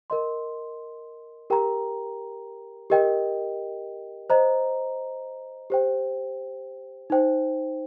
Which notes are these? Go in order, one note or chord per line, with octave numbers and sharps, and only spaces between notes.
A#4 D#5 C6
G4 A#4 G5 A#5
G4 A#4 D#5 G5
C5 D#5 A#5
G4 C5 G5
D#4 C5 G5